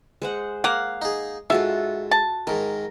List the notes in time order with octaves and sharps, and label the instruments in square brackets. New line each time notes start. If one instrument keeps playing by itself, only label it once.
[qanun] G#3 C5 F#5
[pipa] A#3 F#5 [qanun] F5
[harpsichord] D#4 G#4
[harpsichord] G#2 [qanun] F4 F#4 A4 [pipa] E5
[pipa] A5
[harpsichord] G#2 D#3 [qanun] A#4